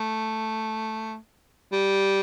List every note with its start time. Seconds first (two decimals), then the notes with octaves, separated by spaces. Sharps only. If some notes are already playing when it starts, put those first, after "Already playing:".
Already playing: A3
1.73 G3